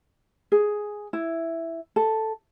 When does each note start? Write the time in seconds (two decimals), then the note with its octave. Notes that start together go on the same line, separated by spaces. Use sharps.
0.52 G#4
1.13 E4
1.96 A4